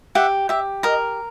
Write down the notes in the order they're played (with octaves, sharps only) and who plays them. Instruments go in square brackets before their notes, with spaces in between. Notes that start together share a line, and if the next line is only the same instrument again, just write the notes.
[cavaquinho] G4 E5 F#5
G4 E5
A#4 D#5